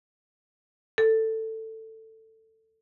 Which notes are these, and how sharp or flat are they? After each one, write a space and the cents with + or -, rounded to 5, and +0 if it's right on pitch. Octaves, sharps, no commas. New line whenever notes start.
A4 +15